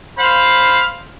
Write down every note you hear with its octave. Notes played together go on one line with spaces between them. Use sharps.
C5 F5 B5